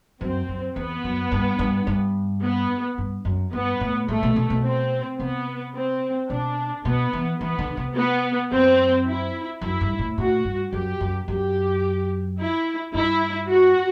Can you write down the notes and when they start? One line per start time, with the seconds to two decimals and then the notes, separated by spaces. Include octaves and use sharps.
0.21 F#2 C4
0.49 F#2
0.76 E2 B3
1.04 F#2
1.32 G2
1.59 G2
1.87 G2
2.43 B3
2.98 G2
3.25 F#2
3.53 G2 B3
3.81 A2
4.08 A2 A3
4.23 B2
4.36 B2
4.50 B2
4.63 C4
5.19 C3 B3
5.74 C4
6.30 B2 D4
6.85 B2 B3
7.13 E3
7.40 E3 B3
7.59 D3
7.77 C3
7.96 B3
8.51 F#2 C4
9.06 E4
9.61 F#2 E4
9.81 G2
9.99 A2
10.18 A2 F#4
10.45 G2
10.73 F#2 G4
11.01 F#2
11.28 F#2 G4
12.39 E4
12.94 G2 E4
13.50 F#4